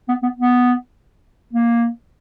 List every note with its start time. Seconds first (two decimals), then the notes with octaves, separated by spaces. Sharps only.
0.08 B3
0.23 B3
0.37 B3
1.53 A#3